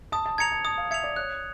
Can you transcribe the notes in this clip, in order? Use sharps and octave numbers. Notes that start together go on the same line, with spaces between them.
A5 D#6
A5
A#5 G#6 C#7 F7
A5
A5 D#6
F5
E5 G#6 C#7 F7
D5
C#5 F#6